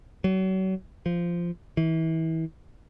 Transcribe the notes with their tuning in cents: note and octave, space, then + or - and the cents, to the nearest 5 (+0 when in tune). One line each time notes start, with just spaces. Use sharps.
F#3 +35
F3 -10
E3 -30